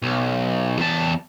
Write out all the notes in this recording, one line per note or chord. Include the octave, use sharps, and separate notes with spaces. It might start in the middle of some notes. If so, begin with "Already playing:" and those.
B1
E2 A5